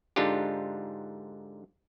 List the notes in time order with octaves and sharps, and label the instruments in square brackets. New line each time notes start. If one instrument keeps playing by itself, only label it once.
[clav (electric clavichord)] G#2 D3 D4 D#4 F4 G4